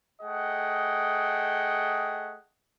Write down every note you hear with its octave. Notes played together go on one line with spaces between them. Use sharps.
A3 G#4 D#5 F#5 G5